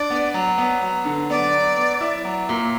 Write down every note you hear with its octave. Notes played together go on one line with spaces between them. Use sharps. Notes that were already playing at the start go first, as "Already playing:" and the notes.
Already playing: D4 D5
B3
F#3
B3
F#3
D3
B3 D5
F#3
B3
E4
F#3
A#2